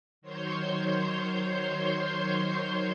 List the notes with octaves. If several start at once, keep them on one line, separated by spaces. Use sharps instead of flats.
D#3 F#3 C5 C#5 C6 G6